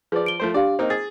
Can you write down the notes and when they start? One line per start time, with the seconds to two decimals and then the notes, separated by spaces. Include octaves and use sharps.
0.12 F3 G#4 B4 D5
0.26 D7 G7
0.40 F3 A3 C5
0.54 D4 G4 D5 F5
0.79 A#3 C4 D#4 C5
0.90 G#4 A6